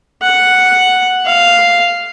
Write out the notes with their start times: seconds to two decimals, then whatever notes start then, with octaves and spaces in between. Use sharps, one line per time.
0.22 F#5
1.25 F5